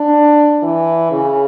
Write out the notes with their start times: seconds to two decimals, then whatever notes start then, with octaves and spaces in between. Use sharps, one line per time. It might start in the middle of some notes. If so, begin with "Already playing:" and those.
Already playing: D4
0.63 E3
1.11 C#3